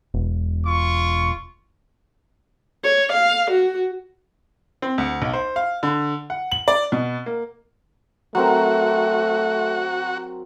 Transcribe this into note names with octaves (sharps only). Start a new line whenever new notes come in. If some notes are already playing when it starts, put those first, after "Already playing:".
E1
F4 C#6
C#5
F5
F#4
C4
D2
B1
C5
F5
D3
F#5
F#7
D5
B2
A#3
F#3 A3 C4 F#4 A#4